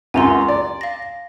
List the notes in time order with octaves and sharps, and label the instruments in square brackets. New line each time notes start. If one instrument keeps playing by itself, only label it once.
[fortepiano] C#2 F#2 [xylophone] G#5 A#5 C6
[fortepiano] D5
[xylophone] F5 A#6